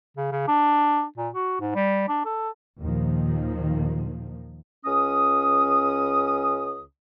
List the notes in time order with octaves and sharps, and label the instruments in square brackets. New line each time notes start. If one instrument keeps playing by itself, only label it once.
[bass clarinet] C#3
C#3
D4
A#2
F#4
G#2
G3
D4
A4
[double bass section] D#2 A#2 D#3 F3
[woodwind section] C#2 C#4 D#6